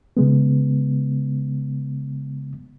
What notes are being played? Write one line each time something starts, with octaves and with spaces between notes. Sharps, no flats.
C#3 G#3 B3